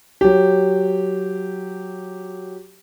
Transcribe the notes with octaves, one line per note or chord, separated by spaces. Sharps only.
F#3 G4